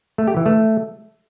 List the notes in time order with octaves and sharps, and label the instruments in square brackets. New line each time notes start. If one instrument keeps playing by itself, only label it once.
[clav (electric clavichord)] A3
G4
E3
A3